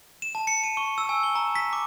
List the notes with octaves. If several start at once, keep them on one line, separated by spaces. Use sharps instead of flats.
E7
A5
C#7
D#7
C#6
E6
G#5
G7
A#5
B6
D6